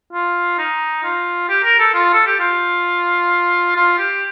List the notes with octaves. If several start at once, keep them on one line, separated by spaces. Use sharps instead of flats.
F4
D#4
F4
G4
A#4
A4
F4
A4
G4
F4
F4
G4